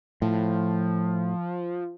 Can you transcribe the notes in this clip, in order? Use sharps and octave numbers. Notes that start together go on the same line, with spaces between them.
A2 F3